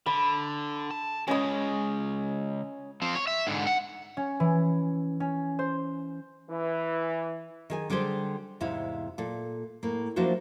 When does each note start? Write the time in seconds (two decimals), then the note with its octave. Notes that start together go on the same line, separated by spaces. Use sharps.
0.06 D3 B5
0.91 A5
1.27 C#3 G#3 C#4 D#5 D#6
3.02 F3 C4
3.15 C#5
3.27 E5
3.47 G#2 D3
3.67 F#5
4.17 C#4
4.40 E3
5.20 C#4
5.59 C5
6.51 E3
7.70 D#3 G#4 G#5
7.90 D3 G3 G4 G#4 C5
8.60 E2 G#2 C3 G#3 E4 F5
9.18 A#2 A4
9.83 A2 A#3
10.16 F3 A#3 D4 E4 F#4 C5